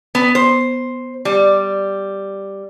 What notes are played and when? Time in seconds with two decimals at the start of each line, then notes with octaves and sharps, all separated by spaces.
0.15 B3
0.35 C5
1.25 G3